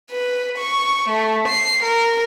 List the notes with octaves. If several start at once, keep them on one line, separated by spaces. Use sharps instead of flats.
B4
C#6
A3
C7
A#4